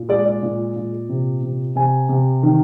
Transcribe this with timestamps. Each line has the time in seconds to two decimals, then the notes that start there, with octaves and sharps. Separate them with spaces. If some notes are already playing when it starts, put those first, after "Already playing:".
Already playing: A#2
0.09 G#3 D5
0.26 D5
0.43 A#2
0.76 A#2
1.09 C3
1.42 C3
1.76 C3 G#5
2.09 C3
2.43 D#3